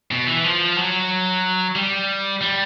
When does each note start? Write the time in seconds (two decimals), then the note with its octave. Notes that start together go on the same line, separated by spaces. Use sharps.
0.11 B2
0.27 E3
0.44 F3
0.77 F#3
1.76 G3
2.41 G3